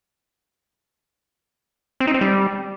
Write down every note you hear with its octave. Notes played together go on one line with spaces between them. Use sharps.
C4
D#4
C4
G3